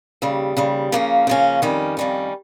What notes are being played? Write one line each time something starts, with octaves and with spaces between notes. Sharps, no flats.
D#2 C#3 G3
D#2 C#3 G3
C#3 F3 A#3 C#4
C#3 F3 A#3 C#4
F2 D#3 G3 C#4
F2 D#3 G3 C#4